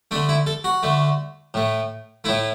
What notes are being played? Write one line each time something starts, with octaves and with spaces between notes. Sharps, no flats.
D3 A3 D4
E4
A4
F#4
D3 A3
A2 A3
A2 A3 E4